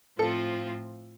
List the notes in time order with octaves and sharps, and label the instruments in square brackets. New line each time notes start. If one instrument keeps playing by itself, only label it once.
[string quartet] A2 F3 C4 F4 [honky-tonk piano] A4